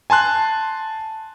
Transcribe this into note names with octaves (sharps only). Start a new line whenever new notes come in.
G#5 A5 C6 F#6